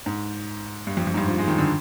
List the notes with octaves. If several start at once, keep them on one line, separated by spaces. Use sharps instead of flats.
G#2
G2
F2
F2
G#2
G2
F3
G#3
D#3
D3